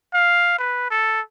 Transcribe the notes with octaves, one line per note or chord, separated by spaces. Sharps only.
F5
B4
A4